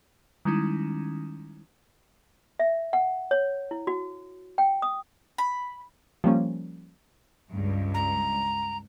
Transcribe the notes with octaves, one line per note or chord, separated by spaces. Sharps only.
D#3 G3 G#3 C#4 D#4 E4
E5
F#5
C#5
E4
F#4
G5
D#6
B5
F3 G3 A#3 C#4
C#2 G2
A#5